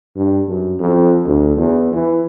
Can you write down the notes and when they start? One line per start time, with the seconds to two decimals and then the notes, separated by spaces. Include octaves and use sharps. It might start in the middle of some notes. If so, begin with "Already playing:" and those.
0.16 G2
0.48 F#2
0.79 F2
1.26 D2
1.57 E2
1.93 E3